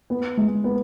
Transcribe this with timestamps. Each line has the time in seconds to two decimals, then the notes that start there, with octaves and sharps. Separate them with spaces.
0.10 B3
0.37 G#3
0.64 B3